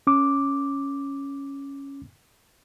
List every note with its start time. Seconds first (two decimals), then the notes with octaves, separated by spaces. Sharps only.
0.07 C#4 D6